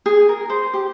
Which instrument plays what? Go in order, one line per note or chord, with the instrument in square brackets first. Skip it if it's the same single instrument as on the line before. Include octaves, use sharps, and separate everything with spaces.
[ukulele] G#4
A#4
C5
G4